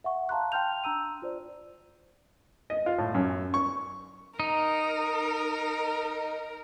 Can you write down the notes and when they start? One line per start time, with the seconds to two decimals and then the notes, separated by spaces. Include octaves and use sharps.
0.04 E5 F#5 C#6
0.29 F5 A5 A#5 C6 F#6
0.52 G5 A5 C6 F6 G6 F7
0.84 D4 A#5 E6 D#7
1.22 F4 C5 D5
2.70 D#5
2.86 F4
2.98 A2
3.15 F#2
3.54 C#6
4.40 D#4 A#4